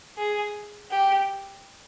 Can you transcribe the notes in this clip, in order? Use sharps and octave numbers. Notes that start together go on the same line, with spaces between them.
G#4
G4